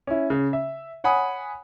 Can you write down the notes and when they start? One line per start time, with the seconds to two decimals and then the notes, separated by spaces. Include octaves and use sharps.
0.07 C#4 E4
0.30 C#3
0.53 E5
1.04 C#5 F#5 G#5 B5 D#6